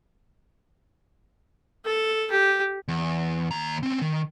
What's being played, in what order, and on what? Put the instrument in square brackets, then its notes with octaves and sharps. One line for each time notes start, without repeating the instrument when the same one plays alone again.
[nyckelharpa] A4
G4
[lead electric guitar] E2
D#2 A#5
C4 C#4
D#3